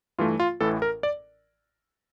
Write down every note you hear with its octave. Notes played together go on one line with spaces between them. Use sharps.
G2 E3 A3 F4
F4
A1 A2 E3 A4
A#4
D5